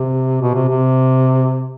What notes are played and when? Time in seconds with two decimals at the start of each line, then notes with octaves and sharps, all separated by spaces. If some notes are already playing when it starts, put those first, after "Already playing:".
Already playing: C3
0.42 B2
0.55 C3
0.69 C3